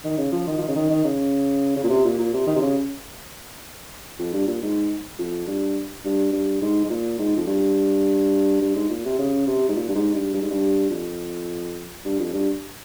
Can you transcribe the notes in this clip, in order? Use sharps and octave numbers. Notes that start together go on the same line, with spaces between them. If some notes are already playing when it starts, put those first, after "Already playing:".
D#3
C#3
F3
D#3
F3
D#3
C#3
D#3
D#3
C#3
C#3
A#2
C3
A#2
A#2
C3
D#3
C3
C#3
F2
G2
A#2
G#2
F2
G2
G2
G2
G#2
G#2
A#2
G#2
F2
G2
G2
G#2
A#2
C3
C#3
C3
G#2
A#2
G2
G#2
G2
G2
G#2
G2
F2
G2
F2
G2